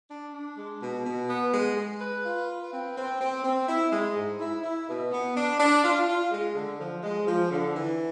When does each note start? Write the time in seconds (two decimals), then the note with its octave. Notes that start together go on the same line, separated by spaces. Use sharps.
0.09 D4
0.33 D4
0.57 G#3
0.80 B2
1.05 B2
1.28 B3
1.52 G#3
1.76 G#3
2.00 B4
2.24 F4
2.48 B4
2.72 C4
2.96 C4
3.20 C4
3.44 C4
3.68 E4
3.92 G#3
4.16 G#2
4.40 E4
4.63 E4
4.88 B2
5.11 B3
5.35 D4
5.59 D4
5.83 F4
6.07 F4
6.31 G#3
6.55 D3
6.79 F3
7.03 G#3
7.27 F3
7.50 D3
7.74 E3